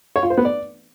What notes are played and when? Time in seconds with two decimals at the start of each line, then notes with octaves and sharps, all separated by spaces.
0.16 C#5
0.23 F4
0.30 C5
0.37 B3
0.45 D5